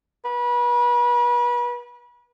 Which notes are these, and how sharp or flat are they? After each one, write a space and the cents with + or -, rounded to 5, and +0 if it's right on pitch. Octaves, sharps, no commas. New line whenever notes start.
B4 -35